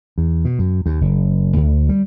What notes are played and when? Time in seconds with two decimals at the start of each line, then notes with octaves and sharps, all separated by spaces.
0.18 E2
0.45 B2
0.59 F#2
0.86 D#2
1.01 F#1
1.56 D2
1.89 G3